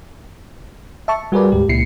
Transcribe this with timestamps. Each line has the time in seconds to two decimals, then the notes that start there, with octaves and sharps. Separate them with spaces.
1.08 E5 A5 C#6
1.32 G3 F#4 G#4 A#4 B4 D5
1.52 D2 G#2 G4
1.69 C#2 A#2 E4 C7 C#7